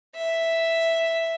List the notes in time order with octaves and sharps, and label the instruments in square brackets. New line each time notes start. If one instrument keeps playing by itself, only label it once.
[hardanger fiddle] E5